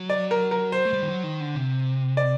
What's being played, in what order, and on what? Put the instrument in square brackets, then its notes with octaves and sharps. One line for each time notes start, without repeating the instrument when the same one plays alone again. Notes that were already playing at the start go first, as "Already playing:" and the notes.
Already playing: [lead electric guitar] F#3
[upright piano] D5
A#4
A#4
C5
[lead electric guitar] A3
G3
D#3
F#3
D#3
D3
C3
[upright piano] D5